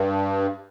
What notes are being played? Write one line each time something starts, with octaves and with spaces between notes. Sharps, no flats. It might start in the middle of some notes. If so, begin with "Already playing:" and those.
Already playing: G2